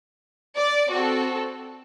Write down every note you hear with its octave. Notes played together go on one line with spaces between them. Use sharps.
D5
C4 F#4 A4